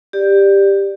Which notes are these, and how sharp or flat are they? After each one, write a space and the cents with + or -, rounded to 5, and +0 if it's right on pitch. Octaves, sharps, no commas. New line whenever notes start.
G4 +10 D5 +10